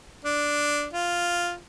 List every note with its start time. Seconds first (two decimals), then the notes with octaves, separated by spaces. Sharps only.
0.25 D4
0.93 F4